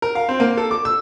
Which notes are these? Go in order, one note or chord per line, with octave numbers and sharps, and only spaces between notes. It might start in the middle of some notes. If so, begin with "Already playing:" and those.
A#4
F5
C4
A#3
A4
D6
E6